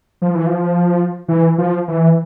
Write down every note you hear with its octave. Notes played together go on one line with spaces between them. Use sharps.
F3
E3
F3
E3
F3
E3